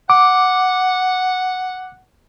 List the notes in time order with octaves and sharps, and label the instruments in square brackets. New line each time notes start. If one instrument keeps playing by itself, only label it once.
[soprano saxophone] F#5 [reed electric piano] D6